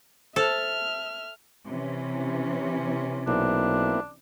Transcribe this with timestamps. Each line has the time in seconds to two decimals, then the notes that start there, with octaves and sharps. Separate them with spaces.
0.36 A4 C5 E5 F6
1.67 C3 E3 C#4
3.27 B1 A#3 C4 D4 E4